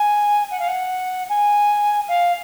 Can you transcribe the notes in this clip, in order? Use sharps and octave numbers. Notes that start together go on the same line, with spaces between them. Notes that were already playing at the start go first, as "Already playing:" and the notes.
Already playing: G#5
F#5
F5
F#5
G#5
F5